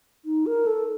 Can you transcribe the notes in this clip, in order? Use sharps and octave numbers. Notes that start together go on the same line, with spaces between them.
D#4
A#4
A4